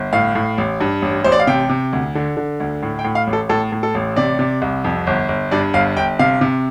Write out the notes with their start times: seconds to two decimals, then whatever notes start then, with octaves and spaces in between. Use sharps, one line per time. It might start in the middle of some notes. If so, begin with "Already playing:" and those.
Already playing: G1
0.13 A2 F5
0.35 A2
0.58 A1
0.80 G2
1.02 A1
1.24 A1 C5
1.32 D5
1.39 F5
1.47 C3 G5
1.69 C3
1.93 D2
2.15 D3
2.37 D3
2.60 D2
2.83 A2
2.99 G5
3.05 A2
3.15 F5
3.27 A1
3.33 A4
3.49 A2 A4
3.72 A2
3.83 A4
3.95 A1
4.16 C3 D5
4.39 C3
4.62 C2
4.84 F2
5.07 G1
5.29 G1
5.51 G2 D5
5.73 G1 F5
5.97 G1 G5
6.19 C3 F5
6.41 C3